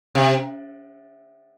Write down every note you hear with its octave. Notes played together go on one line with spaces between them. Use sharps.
C3